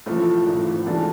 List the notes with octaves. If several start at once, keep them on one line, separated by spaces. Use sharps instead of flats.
B1 A2 E3 F3 A3
G#1 G#2 E3
B2 E3 G#3 A3 D4 F4 G#4